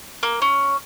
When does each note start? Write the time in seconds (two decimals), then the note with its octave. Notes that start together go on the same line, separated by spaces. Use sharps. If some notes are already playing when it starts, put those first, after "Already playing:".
0.23 A#3
0.42 C#4